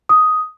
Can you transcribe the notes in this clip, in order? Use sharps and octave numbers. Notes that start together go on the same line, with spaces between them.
D#6